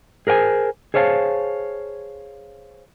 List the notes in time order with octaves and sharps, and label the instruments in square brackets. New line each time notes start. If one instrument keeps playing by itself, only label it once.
[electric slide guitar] G#4 A#4 C5 G5 G#5
G#4 C5 C#5 F5 G5 A5